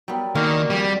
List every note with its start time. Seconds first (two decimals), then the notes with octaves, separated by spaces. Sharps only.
0.08 F#3 G3 B3 A#4
0.35 D#3 A#3 C5 D5 G#5
0.70 F2 G3 G#4 D5